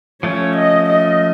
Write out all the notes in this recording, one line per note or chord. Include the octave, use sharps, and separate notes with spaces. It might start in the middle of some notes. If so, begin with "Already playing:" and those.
F3 A3 C#4 C#5
D#5
D#5